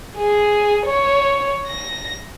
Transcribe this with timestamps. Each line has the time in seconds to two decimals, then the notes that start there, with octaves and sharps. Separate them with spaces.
0.17 G#4
0.86 C#5
1.68 A#6